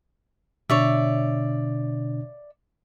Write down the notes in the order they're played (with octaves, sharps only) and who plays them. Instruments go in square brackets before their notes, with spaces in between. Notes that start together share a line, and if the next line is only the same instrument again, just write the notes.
[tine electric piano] B2 D3 D4 [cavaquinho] C#5 D5 E5